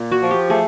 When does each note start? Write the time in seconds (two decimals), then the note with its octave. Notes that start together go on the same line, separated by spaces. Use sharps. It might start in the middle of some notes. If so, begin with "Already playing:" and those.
Already playing: A#2
0.12 F#4
0.22 F3
0.31 G4
0.50 A3 G#4